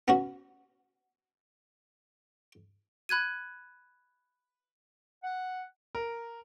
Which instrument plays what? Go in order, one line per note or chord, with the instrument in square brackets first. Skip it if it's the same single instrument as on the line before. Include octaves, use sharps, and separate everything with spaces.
[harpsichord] B3 C#4 F#4
[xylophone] B5 F#6 G#6 D#7
[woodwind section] F#5
[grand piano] A#4